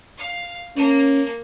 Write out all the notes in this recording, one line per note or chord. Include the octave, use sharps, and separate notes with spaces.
F5
A#3 C#4